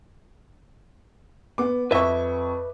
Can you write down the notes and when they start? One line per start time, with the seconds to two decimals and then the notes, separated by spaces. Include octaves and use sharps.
1.58 B3 D6
1.91 F2 B4 E5 C#6